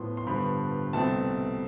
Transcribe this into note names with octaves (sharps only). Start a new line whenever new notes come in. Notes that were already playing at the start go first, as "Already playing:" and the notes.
Already playing: A2 F3 B3 C6
C6
G2 D3 F3 B3 B5
C2 B2 A3 C4 A5